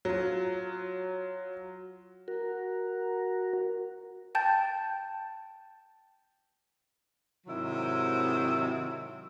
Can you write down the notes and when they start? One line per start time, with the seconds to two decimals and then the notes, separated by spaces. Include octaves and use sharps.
0.05 F#3 F4
2.28 F#4 A#4
4.35 G5 A5 G6 A6
7.47 G#2 C3 D#3 F#3 E4